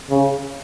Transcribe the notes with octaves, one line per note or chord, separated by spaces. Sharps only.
C#3